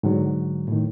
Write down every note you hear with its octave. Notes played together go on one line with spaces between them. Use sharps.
G#2 D3 F#3
A2 D#3